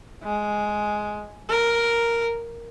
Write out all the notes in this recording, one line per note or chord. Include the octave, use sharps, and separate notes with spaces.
G#3
A#4